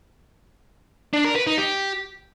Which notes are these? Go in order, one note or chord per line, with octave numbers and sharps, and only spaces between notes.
D4
A#4
B4
D#4
G4